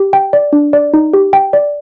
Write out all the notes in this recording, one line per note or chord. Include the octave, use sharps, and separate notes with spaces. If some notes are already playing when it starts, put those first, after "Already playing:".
Already playing: G4
G5
D5
D4
D5
D#4
G4
G5
D5